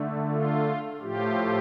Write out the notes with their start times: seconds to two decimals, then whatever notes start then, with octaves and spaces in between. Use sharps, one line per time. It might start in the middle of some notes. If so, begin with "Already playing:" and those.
Already playing: D3 A3
0.29 F4
1.01 A2 F3 A3 F4 G4